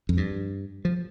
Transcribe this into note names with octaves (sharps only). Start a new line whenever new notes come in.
F2
G2
F3